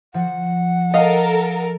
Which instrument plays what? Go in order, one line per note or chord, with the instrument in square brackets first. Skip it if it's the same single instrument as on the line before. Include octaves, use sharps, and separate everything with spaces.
[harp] F3 [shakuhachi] F#5
[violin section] A4 A#4 [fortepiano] D#5 F5